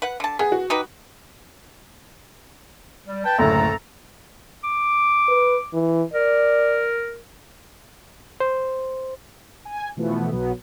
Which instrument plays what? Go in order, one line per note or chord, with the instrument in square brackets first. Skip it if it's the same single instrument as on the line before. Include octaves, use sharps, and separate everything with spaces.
[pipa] B4 F#5
D3 A5
[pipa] B3 [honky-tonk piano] G#4
[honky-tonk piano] F#4
[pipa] D#4 G4 B4
[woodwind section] G3
B4 G5 A5
[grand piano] F#1 D2 A2 [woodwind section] A4 A#5
[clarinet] D6
[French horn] B4
E3
[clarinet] A#4 [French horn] D5
[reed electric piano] C5
[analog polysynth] G#5
B2 E3 F3 A3 B3
B1 B2 F#3 B3